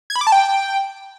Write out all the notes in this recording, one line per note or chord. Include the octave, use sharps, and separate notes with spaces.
G#6
B5
D6
A5
G5